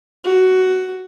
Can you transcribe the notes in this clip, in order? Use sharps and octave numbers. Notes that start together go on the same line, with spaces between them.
F#4